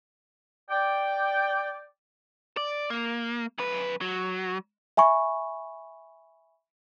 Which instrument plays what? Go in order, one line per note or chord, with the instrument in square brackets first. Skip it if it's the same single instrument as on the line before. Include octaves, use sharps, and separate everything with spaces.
[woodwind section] D5 G5
[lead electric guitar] D5
A#3
F#2 B4
F#3
[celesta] E5 G#5 B5 C#6